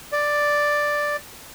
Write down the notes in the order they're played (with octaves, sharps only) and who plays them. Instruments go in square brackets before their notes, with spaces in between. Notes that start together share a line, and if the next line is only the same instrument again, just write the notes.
[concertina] D5